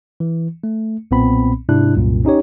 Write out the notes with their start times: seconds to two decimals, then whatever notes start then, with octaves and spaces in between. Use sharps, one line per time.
0.20 E3
0.64 A3
1.11 B1 A#2 B3 C4 B5
1.69 G#2 C3 D4 E4 F#6
1.96 C2 F#2 A#2
2.25 C#4 D#4 G4 C#5